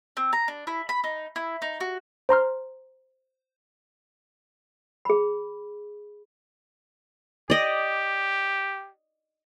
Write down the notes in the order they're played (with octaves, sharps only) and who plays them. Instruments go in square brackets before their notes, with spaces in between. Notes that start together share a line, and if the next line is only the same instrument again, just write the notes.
[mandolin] C4
A#5
D4
E4
B5
D#4
E4
D#4
F#4
[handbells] C5 A#5 C6 F6
[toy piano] G#4 B5
[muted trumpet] G4 [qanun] D5 D#5